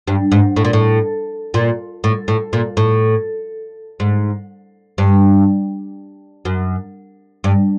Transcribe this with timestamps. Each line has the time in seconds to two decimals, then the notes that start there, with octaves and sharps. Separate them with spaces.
0.07 G2
0.32 G#2
0.56 A2
0.65 A#2
0.73 A2
1.54 A#2
2.04 A2
2.28 A2
2.53 A#2
2.77 A2
4.00 G#2
4.98 G2
6.45 F#2
7.44 G2